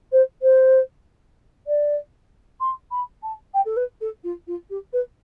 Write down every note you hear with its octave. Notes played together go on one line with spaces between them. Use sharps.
C5
C5
D5
C6
B5
A5
G5
A4
B4
A4
F4
F4
G4
B4